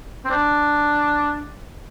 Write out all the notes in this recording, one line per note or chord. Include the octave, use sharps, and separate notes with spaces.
C4
D4